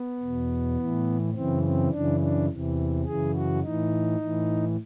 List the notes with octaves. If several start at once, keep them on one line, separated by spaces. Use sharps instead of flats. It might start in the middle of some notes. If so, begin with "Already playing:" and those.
Already playing: B3
E2 B2
A2 E3
F#2 C#3 E3 C4
C4
F#2 C#3 E3 D4
D4
E2 C3 E3
F#2 C#3 E3 G#4
F#4
A2 E3 D#4
A2 E3